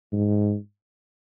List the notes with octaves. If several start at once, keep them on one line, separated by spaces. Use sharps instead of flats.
G#2